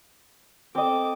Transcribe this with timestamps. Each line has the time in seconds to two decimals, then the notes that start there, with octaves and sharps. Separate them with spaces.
0.75 C4 A4 D#5 D6